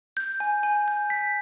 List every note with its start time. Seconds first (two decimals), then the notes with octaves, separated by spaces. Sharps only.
0.17 G6
0.40 G#5
0.63 G#5
0.88 G6
1.10 B6